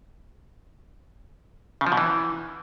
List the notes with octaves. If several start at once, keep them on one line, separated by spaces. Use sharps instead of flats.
C#3
F3
B2
E3